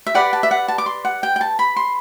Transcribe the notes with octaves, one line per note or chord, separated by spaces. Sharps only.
E5
G4 B4 D5 F#5
A5
E5
F#5
A5
D6
C6
F#5
G5
G5
A5
B5
C6